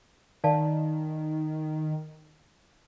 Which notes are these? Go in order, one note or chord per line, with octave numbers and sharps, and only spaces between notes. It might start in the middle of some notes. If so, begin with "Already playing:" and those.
D#3 D5 F5 A5